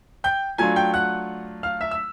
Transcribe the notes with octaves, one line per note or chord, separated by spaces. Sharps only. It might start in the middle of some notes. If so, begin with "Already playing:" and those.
G5 G6
F#3 A3 D4 F4 G#5 G#6
G5 G6
F#5 F#6
F5 F6
E5 E6
E6